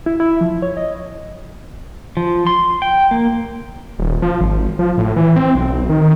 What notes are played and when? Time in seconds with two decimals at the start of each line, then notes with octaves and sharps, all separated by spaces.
0.06 E4
0.20 E4
0.41 F3
0.62 C#5
0.77 D#5
2.17 F3
2.47 C6
2.82 G5
3.11 A#3
3.99 D#1
4.22 F3
4.41 G#1
4.79 F3
4.97 A2
5.16 E3
5.36 C4
5.56 B1
5.89 D#3